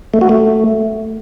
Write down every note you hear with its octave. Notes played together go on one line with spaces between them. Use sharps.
A3
F#4
A3